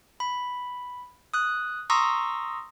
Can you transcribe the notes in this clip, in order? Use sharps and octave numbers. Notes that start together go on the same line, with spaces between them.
B5
D#6 F#6
A#5 C6 C#6 D#6 E6 A#6